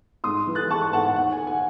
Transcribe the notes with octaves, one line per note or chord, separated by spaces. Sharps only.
G#2 C6 D#6
E3
F#6 A6
G#3 A5 C#6
A5 C#6
G#2 F#5 A5
F#5 A5
D#2 F#5
G#5
D#3
G#5